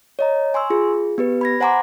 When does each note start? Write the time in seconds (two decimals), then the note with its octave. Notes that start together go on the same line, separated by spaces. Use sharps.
0.19 C#5 D#5 A#5
0.54 G#5 C6 C#6 E6
0.70 F4 G#4
1.18 B3 G4 B4
1.41 B5 G#6 A#6
1.60 C5 F#5 G#5 A#5 C6 D6